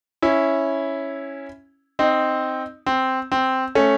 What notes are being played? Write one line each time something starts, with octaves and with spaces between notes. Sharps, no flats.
C#4 E4
C4 D#4
C4
C4
A3 C#4